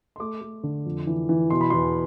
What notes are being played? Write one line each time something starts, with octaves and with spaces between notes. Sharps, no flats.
C6
A3 D6
A3
D3
F2
E3
E3
B2 C6
B5
E2 C6